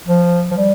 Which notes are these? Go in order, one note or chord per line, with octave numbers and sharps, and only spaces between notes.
F3
F3
G3